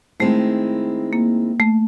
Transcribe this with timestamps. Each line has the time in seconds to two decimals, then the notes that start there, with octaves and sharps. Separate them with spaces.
0.20 D#3 G#3 A3 C4 E4
1.13 A#3
1.60 A3